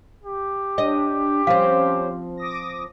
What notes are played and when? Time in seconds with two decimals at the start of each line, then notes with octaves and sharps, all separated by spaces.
0.23 G4
0.78 D4 D#5
1.47 F3 C4 C#4 C5 F5
2.37 D6 D#6 A#6